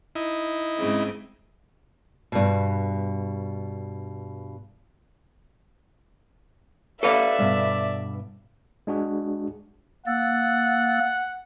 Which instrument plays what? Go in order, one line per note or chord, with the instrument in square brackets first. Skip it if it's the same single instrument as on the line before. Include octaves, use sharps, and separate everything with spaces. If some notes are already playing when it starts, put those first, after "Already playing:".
[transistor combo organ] D#4 E4
[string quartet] G#2 C#3 C4
[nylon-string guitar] G2 B2
[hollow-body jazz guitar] A4 B4 F5 [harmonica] D5 [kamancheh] E5
[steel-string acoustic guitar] G2 B2
[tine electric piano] G#3 D4 F#4 G#4
[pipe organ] A#3 E6 A6 [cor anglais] F#5